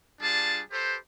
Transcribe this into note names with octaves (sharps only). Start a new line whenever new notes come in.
G3 D4 F4 G#4 A5
G4 A4 B4 C5